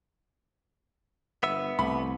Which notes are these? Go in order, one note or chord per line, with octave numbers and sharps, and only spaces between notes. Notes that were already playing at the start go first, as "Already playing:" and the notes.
G1 B3 E5
C2 A3 B5